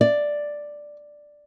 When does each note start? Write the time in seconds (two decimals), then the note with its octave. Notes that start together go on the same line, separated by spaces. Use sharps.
0.01 D5